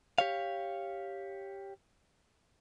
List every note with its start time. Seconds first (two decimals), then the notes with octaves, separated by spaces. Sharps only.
0.18 G4 C#5 F5